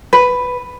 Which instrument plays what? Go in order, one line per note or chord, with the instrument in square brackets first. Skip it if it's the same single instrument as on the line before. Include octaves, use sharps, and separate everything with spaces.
[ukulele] B4